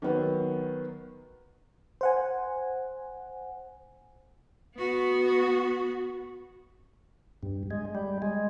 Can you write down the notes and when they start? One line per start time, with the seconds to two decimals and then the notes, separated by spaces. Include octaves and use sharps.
0.02 D#3 F#3 B3
2.01 C5 F#5 G#5
4.76 B3 F#4
7.43 G2
7.71 G#3
7.95 G3
8.22 G#3